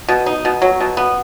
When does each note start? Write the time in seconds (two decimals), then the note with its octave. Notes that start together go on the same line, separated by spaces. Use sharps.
0.08 B2
0.26 D#4
0.45 B2
0.62 F#3
0.80 B2
0.97 B3